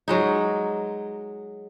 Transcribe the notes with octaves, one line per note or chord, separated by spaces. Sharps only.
F#3 G#3 D#4